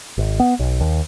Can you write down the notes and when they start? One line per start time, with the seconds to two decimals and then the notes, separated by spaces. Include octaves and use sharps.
0.18 G#1
0.40 B3
0.59 B1
0.81 D#2